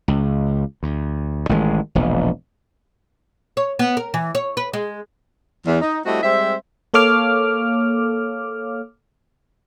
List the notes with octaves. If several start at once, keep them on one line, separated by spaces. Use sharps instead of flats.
C#2
D2
A1 D#3 E3 G#3
E1 A#1
C#5
B3
A#4
E3
C#5
B4
G#3
E2
D#4
G3 A3 C4 E4 F#4 D#5
G3 G#3 C4 C5 E5
A#3 A4 C#5 F5 D6 F6